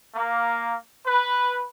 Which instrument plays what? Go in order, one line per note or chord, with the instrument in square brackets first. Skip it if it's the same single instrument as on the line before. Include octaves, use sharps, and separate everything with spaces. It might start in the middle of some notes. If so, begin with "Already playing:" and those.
[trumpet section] A#3
B4